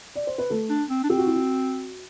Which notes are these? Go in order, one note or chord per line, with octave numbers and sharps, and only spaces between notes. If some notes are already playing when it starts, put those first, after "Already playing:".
D5
C5
B4
A3 A4
D4
C4
D4
C4 G4
F#4
E4
F#4